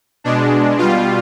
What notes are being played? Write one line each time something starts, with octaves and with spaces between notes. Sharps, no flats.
B2 G#3 D4
B2 G3 F4